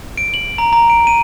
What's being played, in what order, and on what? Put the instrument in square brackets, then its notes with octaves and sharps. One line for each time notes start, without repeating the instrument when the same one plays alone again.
[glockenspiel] D7
F#7
A#5
A#5
D7
D#7